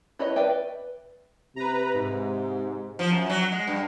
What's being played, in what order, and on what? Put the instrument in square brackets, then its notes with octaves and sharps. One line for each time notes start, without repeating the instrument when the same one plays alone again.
[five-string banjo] E4 B4 C#5 D#5
B4 D5 E5 G5
[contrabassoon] C3 [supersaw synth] B4 A#5
[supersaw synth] G#2
[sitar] F3
F#2
F#3
G#3
G2